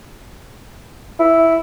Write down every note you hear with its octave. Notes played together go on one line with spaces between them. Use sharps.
E4